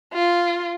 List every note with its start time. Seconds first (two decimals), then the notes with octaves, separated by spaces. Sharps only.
0.13 F4